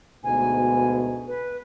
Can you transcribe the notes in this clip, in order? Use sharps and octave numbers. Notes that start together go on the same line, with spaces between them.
D2 G#2 B2 G#5
B4